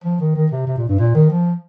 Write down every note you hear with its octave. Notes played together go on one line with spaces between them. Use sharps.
F3
D#3
D#3
C3
C3
A#2
G2
A#2
D#3
F3